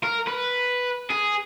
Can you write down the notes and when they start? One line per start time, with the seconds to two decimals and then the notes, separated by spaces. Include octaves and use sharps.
0.04 A#4
0.28 B4
1.10 G#4